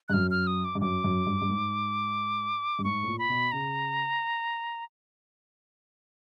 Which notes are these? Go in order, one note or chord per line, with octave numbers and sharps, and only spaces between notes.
G2 F#6
F#2 F6
F6
D#6
D6
G2
F#2 D6
F#2
G2
G2
G#2
G2
G#2 C#6
A2
A#2
B5
B2
C#3 A#5